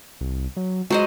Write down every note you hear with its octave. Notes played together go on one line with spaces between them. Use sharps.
C2
F#3
F#3 G#3 C5 D#5